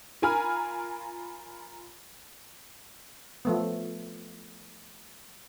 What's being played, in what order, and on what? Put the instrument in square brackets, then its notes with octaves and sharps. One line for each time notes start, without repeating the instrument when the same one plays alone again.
[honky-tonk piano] F4 A#4 G#5 A#5 B5 F6
[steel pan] F3 A3 B3